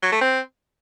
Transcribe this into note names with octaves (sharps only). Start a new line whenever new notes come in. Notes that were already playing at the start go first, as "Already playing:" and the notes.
F#3
A3
C4